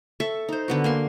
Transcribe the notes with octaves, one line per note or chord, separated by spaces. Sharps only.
A4 E5 C#6
D#4 C5
D3 B3 F#4
A#3 G#5 C6